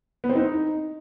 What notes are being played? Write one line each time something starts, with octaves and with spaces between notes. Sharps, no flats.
B3
C4
D#4